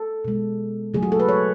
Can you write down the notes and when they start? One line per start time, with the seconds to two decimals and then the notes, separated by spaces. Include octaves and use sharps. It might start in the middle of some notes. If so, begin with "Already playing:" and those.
Already playing: A4
0.25 B2 G#3
0.94 C#3 F#3 A3 G#4
1.03 F#4
1.12 A4
1.20 B4
1.29 C#5